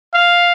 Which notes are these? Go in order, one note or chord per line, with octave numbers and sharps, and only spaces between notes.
F5